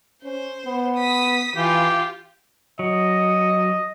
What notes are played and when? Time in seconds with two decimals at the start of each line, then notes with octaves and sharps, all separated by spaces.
0.23 C#4 C5
0.66 B3
0.96 D#6 B6
1.56 E3 F4 G4
2.79 F#3 D#5